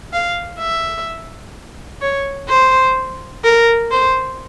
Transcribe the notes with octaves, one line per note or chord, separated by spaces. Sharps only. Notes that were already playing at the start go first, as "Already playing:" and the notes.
F5
E5
C#5
C5
A#4
C5